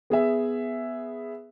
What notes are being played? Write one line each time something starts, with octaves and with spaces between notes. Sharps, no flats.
B3 G#4 E5